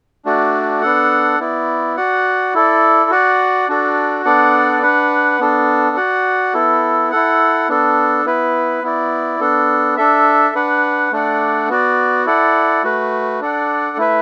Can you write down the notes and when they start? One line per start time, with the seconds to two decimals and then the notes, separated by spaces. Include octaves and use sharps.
0.25 A3 D4 F#4 D5
0.82 B3 D4 A4 F#5
1.40 B3 E4 D5
1.96 F#4 D5 F#5
2.54 E4 A4 D5
3.10 F#4 D5 F#5
3.68 D4 F#4 A4 D5
4.25 B3 D4 A4 D5 F#5
4.82 D4 B4 F#5
5.39 B3 D4 A4
5.96 F#4 D5 F#5
6.54 B3 E4 A4
7.11 E4 A4 F#5
7.69 B3 D4 A4
8.25 B3 E4 B4
8.83 B3 E4 D5
9.40 B3 D4 A4
9.97 D4 A4 E5
10.55 D4 B4 F#5
11.12 A3 D4 A4 D5 F#5
11.69 B3 F#4 D5
12.26 E4 A4 D5 F#5
12.83 A3 F#4 B4
13.40 D4 A4 D5 F#5
13.97 A3 E4 B4 E5